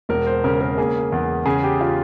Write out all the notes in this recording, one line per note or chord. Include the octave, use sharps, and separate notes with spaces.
E1 A#4
C5
C#3 A#4
A#4
A#3 G#4
E2
C#3 G#4
G4
F4